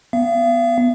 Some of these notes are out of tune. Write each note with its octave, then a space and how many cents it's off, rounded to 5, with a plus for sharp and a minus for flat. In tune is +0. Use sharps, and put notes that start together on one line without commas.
B3 +0 F5 -45